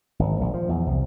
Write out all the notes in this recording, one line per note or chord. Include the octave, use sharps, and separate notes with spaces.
G#1
A#1
F3
E2
C2